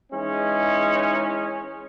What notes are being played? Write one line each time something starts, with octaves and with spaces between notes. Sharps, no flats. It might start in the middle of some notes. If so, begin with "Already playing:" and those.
E3 G#3 C#4 D#4 E4